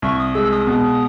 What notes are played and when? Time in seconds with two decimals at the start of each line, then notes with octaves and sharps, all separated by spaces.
0.02 C2 C#6
0.19 D#6
0.34 G#3 E6
0.51 D#6
0.67 B2